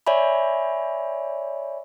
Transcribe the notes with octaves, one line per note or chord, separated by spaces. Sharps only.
C#5 D5 E5 G#5 B5